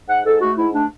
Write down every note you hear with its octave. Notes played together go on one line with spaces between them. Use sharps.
G#2 F#5
G#2 A4
A3 F#4
G#2 E4
A3 D4